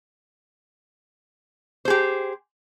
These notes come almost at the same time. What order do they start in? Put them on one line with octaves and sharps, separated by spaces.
C5 G#4 G4